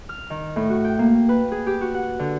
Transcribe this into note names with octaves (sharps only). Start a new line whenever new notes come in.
F6
D#3
A2
F#4
G5
A#3
B4
G#4
G4
F#4
F#5
D3